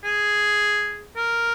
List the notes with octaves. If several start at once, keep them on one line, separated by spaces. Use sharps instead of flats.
G#4
A#4